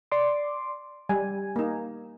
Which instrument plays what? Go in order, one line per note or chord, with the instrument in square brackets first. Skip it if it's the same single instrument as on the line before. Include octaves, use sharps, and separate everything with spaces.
[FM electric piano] D5 C6 D6
[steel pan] G3 [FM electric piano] G#5
[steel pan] A#3 D#4